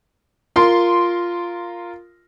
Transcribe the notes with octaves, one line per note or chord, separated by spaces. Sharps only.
F4 A#4 C6